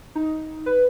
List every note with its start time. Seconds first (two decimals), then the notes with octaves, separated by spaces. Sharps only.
0.15 D#4
0.66 B4